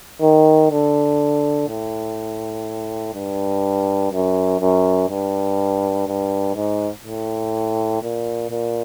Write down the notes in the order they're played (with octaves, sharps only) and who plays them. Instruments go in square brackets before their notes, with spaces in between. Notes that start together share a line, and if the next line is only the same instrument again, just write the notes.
[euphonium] D#3
D3
A2
G2
F#2
F#2
G2
G2
G#2
A2
A#2
A#2